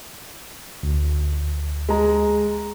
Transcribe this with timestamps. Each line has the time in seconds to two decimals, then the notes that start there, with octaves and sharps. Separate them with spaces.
0.83 D2
1.89 G#3 A#5